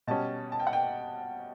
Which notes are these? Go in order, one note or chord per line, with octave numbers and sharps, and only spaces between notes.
B2 G3 C#4 A5
A5
G5
F#5
G5